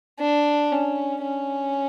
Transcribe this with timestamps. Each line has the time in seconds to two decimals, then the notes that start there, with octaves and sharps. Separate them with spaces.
0.20 D4
0.72 C#4
1.23 C#4